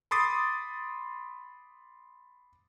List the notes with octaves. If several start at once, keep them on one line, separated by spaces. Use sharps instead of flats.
B5 C6 D6 D#6 A6 C7